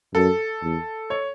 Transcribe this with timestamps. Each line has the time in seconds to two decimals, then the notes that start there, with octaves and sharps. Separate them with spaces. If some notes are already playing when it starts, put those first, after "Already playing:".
0.14 F#2 A4
0.62 E2
1.10 C#5